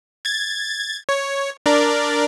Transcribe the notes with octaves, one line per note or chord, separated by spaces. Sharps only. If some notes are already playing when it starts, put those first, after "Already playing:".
G#6 A6
C#5
D4 A#4 D5